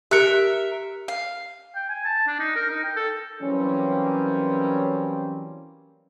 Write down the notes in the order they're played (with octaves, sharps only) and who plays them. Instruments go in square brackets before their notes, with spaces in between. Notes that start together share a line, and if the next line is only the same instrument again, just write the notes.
[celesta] G4 F#6 C#7 [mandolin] A#4 E5
[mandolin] F5
[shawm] G5
G#5
A5
D4
D#4
A#4
D#4
G5
A4
[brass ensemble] E3 F#3 G3 A#3 C4 C#4